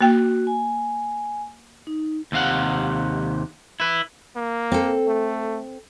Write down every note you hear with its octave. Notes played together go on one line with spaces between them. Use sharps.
A#3 F#4 G5
G#5
D#4
D#2 C3 F5 F#5
E4 B4
A#3
C4 A4
A3